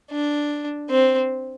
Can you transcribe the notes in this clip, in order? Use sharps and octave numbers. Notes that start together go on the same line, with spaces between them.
D4
C4